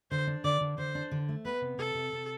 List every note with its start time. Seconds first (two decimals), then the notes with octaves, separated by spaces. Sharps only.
0.11 D3 C5
0.27 D4
0.44 D3 D5
0.61 D3
0.78 D3 C5
0.95 D4
1.12 D3
1.29 A3
1.45 B3 B4
1.61 C3
1.78 C3 A4
1.95 C3
2.12 C3